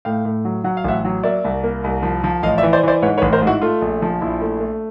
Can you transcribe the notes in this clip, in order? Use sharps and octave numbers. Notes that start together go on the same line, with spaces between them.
A2 F5 G5
A2
F#3
F#3 F#5
F5
A1 E5 F#5
F#3
A#3 D5 E5
C2
A#3
C2
F3
F3
A1 D#5 F5
D5 E5
E3
C5 D5
E3 C5 D5
G#2 B4 C#5
B4 C#5
A1
A#4 C5
G#2
E4 F#4
A3 F4
A#1
F3
A#1 E4
A3
A3